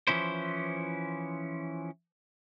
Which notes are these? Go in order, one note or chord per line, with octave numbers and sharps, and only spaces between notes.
E3 F3 C#4 E4 C5